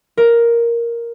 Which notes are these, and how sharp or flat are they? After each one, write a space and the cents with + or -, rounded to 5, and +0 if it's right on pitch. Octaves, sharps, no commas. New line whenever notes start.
A#4 +5